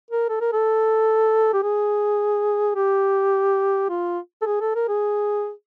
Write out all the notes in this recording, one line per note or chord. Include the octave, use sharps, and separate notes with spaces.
A#4
A4
A#4
A4
G4
G#4
G4
F4
A4
G#4
A4
A#4
G#4